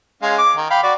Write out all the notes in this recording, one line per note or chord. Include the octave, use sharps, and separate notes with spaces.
G#3 C#4 F5
D6
D#3
F5 G5 B5
F#4 D5